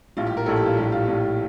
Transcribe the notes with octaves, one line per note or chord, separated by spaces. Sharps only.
A#1 A2 G3 F4
G4
A#4
A#1 A2 G3 A4
G4
F4
A#1 A2 G3 G4
F4
A#1 A2 G3